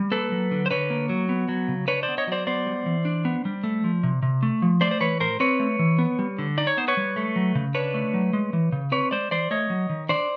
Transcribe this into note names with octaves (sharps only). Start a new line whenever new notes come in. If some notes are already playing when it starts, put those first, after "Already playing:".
Already playing: G3
A#3 A4 B4
F#3
D3
C5
D3 B4 C#5
A#3
F#3
B3
F#3
C#3
D4 B4 C#5
C5 D5
B3
C#5 D#5
F#3 C5 D5
B3 C5 D5
G3
E3
D4
B3
G3
A3
F3
C3
C3
A3
F3
A3 C5 D5
C5
E3 B4 C#5
A2 A#4 C5
C4 B4 C#5
A3
E3
B3
G3
D3
D#4 D5
C#5
B3 C5
B4 C#5
G3
A3
F#3
C#3
D4 B4 C#5
A3
F#3
G#3
E3
C#3
C4 B4 C#5
G#3 C5 D5
E3 C5 D5
A3 C#5 D#5
F#3
D#3
D4 C5 D5